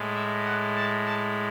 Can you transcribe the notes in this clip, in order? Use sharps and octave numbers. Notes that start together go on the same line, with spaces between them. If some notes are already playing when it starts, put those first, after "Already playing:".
Already playing: A2 G#3
E5
F#5
A5
A5